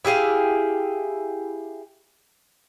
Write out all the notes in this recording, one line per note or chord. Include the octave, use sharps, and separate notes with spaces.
E4 G4 G#4 F5